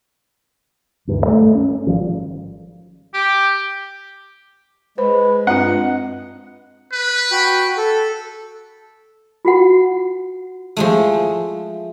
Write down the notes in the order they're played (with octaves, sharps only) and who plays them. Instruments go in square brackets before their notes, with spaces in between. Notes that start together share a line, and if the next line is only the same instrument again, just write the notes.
[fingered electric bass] D2 G2 D#3
A3
C#4
G#1 D#3 F3 G3
[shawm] G4
[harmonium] G#3 [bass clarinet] B4 [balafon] C5
[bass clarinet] G2 [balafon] C4 F4 [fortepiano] F#5
[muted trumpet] B4
[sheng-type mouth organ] F#4 G5 B5
A4
[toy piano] F4 F#4 F#5
[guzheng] F3 G#3 A3